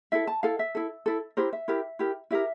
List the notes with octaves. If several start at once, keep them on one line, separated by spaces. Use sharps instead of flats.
E4 A4 E5
A5
E4 A4 F5
E5
E4 A4
E4 A4
E4 G4 A#4 C5
E5
E4 G4 A#4
E4 G4 A#4
E4 G4 A#4 E5